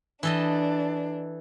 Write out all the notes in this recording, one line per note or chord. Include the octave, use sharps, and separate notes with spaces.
E3 D4 A4 D#5